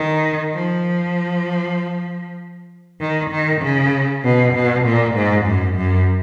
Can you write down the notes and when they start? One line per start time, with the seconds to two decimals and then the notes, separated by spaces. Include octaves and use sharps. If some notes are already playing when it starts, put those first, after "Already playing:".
Already playing: D#3
0.55 F3
3.01 D#3
3.31 D#3
3.62 C#3
4.24 B2
4.54 B2
4.85 A#2
5.16 G#2
5.46 F#2
5.76 F#2